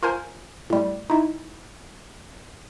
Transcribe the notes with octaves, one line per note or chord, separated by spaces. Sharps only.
F4 A#4 C5 G#5
A2 G3
D#4 E4